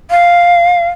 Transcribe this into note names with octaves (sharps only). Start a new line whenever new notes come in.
F5